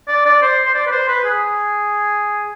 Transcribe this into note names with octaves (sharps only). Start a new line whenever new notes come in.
D5
D5
C5
C5
D5
B4
C5
B4
G#4